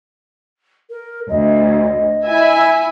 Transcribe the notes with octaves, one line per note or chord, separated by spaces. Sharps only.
A#4
D2 D#5
E4 E5 G#5